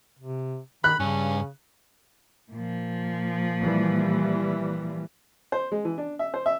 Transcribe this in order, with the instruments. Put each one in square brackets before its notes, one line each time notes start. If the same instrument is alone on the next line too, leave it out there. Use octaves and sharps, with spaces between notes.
[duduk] C3
[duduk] D#3 [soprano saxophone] B5 [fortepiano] F#6
[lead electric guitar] G2 [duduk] C#3 [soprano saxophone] C#4
[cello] A#2 F3
[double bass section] E3 G3
[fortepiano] C5
G#3
E3
D4
E5
C5
E5